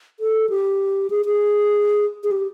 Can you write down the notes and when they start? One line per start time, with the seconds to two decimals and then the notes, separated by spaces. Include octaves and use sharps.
0.20 A4
0.50 G4
1.10 G#4
1.26 G#4
2.24 G#4
2.31 G4